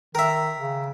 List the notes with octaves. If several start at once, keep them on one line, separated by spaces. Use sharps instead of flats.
D#3 A#4 E5
C#3